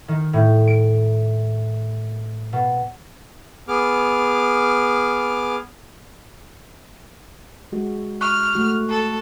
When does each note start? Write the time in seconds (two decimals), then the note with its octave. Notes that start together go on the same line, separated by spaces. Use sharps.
0.08 D#3
0.33 A2
0.67 D7
2.53 B2
3.68 B3 G#4 D6 F6
7.72 G#3 F#4
8.21 C#6 F6 F#6
8.55 A3 F#4
8.90 A4